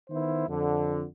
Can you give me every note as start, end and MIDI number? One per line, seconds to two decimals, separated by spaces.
0.10 0.46 51
0.10 0.46 59
0.10 0.46 64
0.10 0.46 72
0.48 1.04 41
0.48 1.04 50